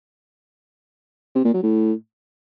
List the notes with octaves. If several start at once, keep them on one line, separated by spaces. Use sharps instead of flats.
C3
A#2
F#3
A2